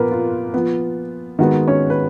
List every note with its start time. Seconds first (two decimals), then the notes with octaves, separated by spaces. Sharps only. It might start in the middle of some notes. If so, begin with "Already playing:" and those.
Already playing: A#2 F3 A#3 B3 A#4 B4
0.11 F4
0.54 F3 B3
1.39 D#3 G#3 B3 F#4
1.68 C#4 C#5
1.90 B4